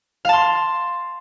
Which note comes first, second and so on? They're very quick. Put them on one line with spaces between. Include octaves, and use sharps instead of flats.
F5 A5 C6